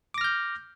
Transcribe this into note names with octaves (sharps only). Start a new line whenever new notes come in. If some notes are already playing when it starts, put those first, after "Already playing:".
D6 F6 G6 A#6